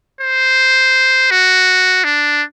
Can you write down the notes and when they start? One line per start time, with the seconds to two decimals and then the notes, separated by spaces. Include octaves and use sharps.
0.21 C5
1.31 F#4
2.04 D4